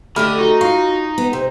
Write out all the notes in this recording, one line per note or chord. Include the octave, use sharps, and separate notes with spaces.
D3 A3 G4 A4 D#5 B5 F6
D#4 F#4
F4 F5 C#6
B3
C3 C5